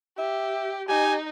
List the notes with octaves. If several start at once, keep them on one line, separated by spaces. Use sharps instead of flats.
G4 E5
D#4 G4 G#5